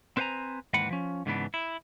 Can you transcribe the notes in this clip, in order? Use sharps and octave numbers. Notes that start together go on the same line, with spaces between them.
C4 B4 C5 F5 G#5 A#5
D#2 G#2 E3 C4 B4 F#5
F3 C#4
G#2 C#3 E3 B3 D4
E4